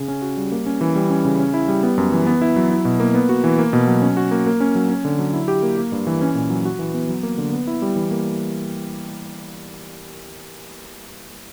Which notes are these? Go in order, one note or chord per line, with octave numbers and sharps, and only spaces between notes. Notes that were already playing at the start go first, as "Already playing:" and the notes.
Already playing: C#3
C#4
F#4
G3
A#3
C#4
E3
G3
C#4
C#3
C#4
E4
G3
B3
F#2
E3
B3
E4
F#3
E4
B2
A#3
B3
F#4
E3
A#3
B2
F#3
C#4
F#4
A#3
A#3
C#4
F#3
C#4
D3
F#3
E4
G4
A#3
A#3
G2
E3
C#4
A#2
F#3
F#4
E3
B3
F#3
A#3
D3
B3
E4
G3
E3
A#3